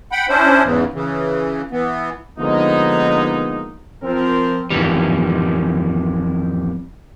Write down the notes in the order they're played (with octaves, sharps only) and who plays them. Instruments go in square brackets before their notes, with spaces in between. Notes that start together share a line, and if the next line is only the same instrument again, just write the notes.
[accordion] F#5 G5 B5
C#4 D4 E4 C5
E2 G#2 C#3 E3
C#3 E3
E3 B3
[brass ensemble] D3 F3 G#3 A#3 B3 D#4
F3 C4 A#4
[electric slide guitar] F2 D#3 E3 G3